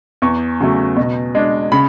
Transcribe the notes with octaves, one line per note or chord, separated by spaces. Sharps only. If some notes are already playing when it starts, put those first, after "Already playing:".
E2 C#6
C#3 F#3 A3
B2
G#3 D4
C#3 B5